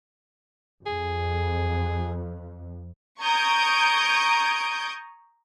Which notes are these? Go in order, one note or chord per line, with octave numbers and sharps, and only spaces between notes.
F2 G#4
A#5 C#6 D#6 G6 G#6 D7